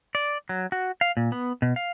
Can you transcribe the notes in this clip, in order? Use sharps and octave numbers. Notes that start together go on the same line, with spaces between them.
D5
F#3
F#4
F5
A#2
B3
B2
F5